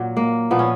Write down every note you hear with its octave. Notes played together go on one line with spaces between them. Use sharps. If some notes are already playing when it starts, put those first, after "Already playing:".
Already playing: A#2 F#3
A#3
A#2 F3 B3
C#4